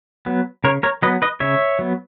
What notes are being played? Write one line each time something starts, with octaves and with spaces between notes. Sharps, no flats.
F#3 B3
C#3 A#4 C#5
A#4 C#5
F#3 B3 B4 D#5
B4 D#5
C#3 C#5 E5
F#3 B3